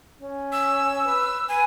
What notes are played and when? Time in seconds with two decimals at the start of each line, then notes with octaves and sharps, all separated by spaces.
0.19 C#4
0.52 E6
1.06 B4
1.49 B4 G#5